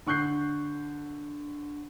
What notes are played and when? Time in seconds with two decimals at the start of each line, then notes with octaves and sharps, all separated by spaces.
0.07 D3 C#6 F#6 G6 C7